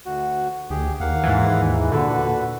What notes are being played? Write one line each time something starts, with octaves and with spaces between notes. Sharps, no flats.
D2 F#4
D2 G4 G#4
D#2 A#3 F5 F#5
G#2 E3
A#2 D3 F#4 A4 B4